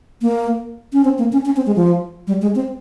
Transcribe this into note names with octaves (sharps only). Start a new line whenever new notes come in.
A#3
C#4
C4
A#3
C#4
C#4
C4
G#3
F3
G3
G#3
C4